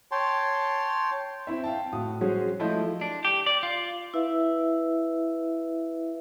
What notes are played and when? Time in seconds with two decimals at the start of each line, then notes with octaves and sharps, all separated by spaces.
0.11 C#5 G5 A5 C6
1.47 C4 E4 E5
1.64 F5 G5 A5
1.93 A2 F#4 D#6
2.21 F#3 G#3 C#4 F#4 G#4 C5
2.59 F3 A3 E4 D#5 C6 G6
3.01 D4
3.25 G4
3.46 D5
3.63 F4
4.14 E4 B4 E5 F5